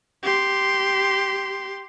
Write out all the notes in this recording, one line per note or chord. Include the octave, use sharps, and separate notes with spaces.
G4 C6